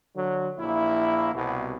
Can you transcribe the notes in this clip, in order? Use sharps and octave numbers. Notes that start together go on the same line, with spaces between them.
D3 F#3
A#1 A#3 E4
C2 B2